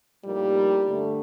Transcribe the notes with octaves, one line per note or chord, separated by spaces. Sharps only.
A2 F3 G3 A#3 D#4 A#4
G2 D3 A3